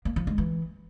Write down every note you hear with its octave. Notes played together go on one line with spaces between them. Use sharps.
A#3
F3
G#3
E3